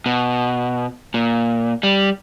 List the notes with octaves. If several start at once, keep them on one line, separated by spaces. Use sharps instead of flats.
B2
A#2
G3